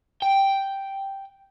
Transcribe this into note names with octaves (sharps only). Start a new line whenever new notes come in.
G5